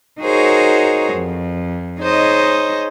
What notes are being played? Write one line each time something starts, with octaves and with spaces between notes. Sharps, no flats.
D#4 F#4 G#4 A#4 C5 C#5
F2
D#4 G#4 C5 C#5 D#5